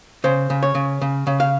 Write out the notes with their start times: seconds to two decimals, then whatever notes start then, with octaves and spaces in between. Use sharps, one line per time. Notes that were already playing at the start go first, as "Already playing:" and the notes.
0.24 C#3 C5
0.50 C#3
0.63 C#5
0.75 C#3
1.01 C#3
1.27 C#3
1.40 F5